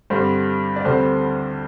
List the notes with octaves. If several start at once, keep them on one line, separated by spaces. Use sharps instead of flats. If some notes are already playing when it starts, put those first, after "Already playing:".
G2 D3 G3 C4 C5
D5
D2 D3 G3 C4 C5